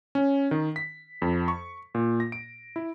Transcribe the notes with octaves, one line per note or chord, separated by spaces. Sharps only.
C#4
D#3
B6
F2
C#6
A#2
A#6
D7
E4